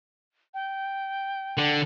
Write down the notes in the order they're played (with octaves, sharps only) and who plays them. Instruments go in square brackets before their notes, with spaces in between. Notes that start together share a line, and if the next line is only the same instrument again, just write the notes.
[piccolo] G5
[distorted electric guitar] D3